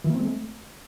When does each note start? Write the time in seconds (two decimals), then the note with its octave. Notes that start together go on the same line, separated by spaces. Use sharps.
0.04 E3
0.10 A#3
0.15 C4
0.20 G#3
0.25 A3